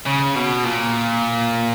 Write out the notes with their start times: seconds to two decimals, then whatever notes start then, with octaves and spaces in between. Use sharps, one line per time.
0.06 C#3
0.35 B2
0.64 A#2